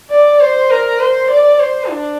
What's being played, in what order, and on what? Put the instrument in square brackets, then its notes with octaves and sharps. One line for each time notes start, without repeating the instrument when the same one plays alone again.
[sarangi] D5
C5
A#4
C5
D5
C5
D4